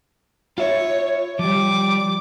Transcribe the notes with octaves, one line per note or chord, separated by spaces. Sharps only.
F4 C#5 E5
F3 G3 D6